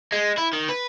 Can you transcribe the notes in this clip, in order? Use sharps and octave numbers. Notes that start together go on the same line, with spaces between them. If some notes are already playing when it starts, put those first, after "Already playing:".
G#3
E4
D#3
B4